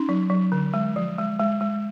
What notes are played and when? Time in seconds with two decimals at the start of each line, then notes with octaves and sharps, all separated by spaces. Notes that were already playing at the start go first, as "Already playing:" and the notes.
Already playing: C#4 D#4
0.09 F#3
0.30 F#3
0.52 D3
0.74 G#3
0.96 F3
1.18 G#3
1.40 G#3
1.61 G#3